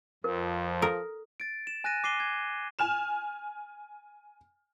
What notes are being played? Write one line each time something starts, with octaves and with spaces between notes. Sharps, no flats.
F2 F3 A#4
A4 A#4
A6 D7
E7
G#5 F#6 A6 A#6 D#7
D6 C7 D#7 G7
G#6
G#5 F6 E7